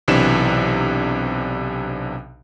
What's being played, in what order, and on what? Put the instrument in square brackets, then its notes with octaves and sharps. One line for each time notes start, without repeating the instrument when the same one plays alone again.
[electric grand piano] B1 C3 E3 D4 E7